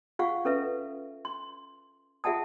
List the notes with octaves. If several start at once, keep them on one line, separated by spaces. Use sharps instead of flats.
F4 G#4 F5 F#5 C#6
C#4 A4 B4 E5
C6
F4 G#4 E5 F#5 A5 D#6